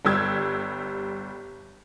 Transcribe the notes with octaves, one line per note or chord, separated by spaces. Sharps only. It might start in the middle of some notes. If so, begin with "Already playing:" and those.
G1 G3 G4 E6 G#6